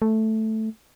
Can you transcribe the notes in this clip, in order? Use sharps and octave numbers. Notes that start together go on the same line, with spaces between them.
A3